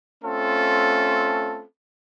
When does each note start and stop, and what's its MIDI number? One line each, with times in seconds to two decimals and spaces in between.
0.24 1.65 57
0.24 1.65 60
0.24 1.65 61
0.24 1.65 65
0.24 1.65 69